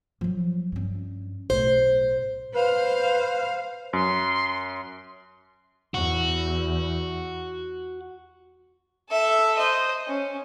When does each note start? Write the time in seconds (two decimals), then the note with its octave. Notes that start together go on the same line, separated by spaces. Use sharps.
0.21 F3 F#3
0.72 G2 C#4
1.50 B1 A2 C5
2.55 B4 C5 F5
3.93 F#2 C6
5.94 E2 F#4
9.09 A4 E5
9.57 C5 D#5
10.07 C#4